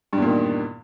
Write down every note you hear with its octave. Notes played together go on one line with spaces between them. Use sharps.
E2 G2 A#2 D#3